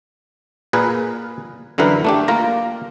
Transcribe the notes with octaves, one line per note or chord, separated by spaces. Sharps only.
A#2 G#4 A#4 B4
F#2 D3 E3 A#4 B4
A3 D4 G4
A#3 F4 A#5